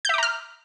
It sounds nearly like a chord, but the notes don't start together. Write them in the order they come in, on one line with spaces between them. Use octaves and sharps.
G6 E5 D6 A#5 F6